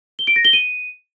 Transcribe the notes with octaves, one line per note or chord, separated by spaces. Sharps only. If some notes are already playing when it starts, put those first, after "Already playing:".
G7
D7
A#6
G7
D#7